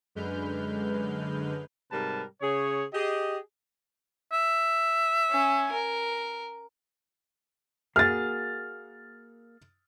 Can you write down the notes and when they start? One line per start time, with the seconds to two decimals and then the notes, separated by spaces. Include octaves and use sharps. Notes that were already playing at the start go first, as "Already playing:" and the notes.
0.15 F#2 D3 G#3 B4 F6 G6
1.92 G#2 C3 G3 A#4 B4 A5
2.41 C#3 G#4 C#5
2.94 G4 G#4 D#5
4.32 E5
5.30 C#4 G#5
5.72 A#4
7.96 A#3 F#4 G#4 F6 A6